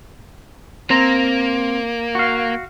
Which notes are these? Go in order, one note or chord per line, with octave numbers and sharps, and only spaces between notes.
A#3 C4 A#5
F#4 F5